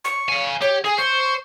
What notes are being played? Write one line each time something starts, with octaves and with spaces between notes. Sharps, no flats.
C#6
F5 G#5
G4 C#5
G#4 G#5
C5 C#6